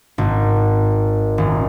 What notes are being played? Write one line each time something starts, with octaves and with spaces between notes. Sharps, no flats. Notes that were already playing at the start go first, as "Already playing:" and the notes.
G#1
D#1